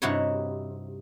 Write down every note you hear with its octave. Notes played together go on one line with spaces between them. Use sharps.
G2 C3 D#4 E4 F#4 C#5